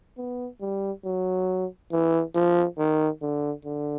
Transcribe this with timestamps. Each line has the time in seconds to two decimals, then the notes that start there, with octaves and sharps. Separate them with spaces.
0.18 B3
0.61 G3
1.05 F#3
1.92 E3
2.35 F3
2.78 D#3
3.22 D3
3.65 D3